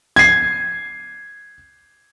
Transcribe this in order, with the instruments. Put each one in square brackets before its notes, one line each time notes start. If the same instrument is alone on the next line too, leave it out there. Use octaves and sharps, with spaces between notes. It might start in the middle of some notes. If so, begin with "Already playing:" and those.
[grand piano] G#6 C7